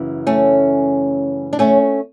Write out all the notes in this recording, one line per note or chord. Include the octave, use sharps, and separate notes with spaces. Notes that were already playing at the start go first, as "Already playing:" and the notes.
Already playing: F#2 C#3 E3
A3 C#4
D4
A3 C#4